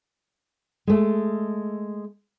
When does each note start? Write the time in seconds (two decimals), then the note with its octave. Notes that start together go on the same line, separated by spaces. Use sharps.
0.87 G#3 A3